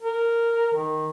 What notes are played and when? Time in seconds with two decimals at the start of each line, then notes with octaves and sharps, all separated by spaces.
0.02 A#4
0.74 D#3